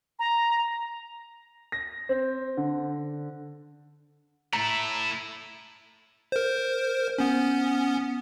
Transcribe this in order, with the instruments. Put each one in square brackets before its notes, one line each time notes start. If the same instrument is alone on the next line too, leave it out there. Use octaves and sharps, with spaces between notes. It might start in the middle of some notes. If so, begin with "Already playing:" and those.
[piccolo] A#5
[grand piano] A#6
C4
D3
[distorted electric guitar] A3 E4 [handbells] A#5
[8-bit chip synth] A#4 C5
B3 C#4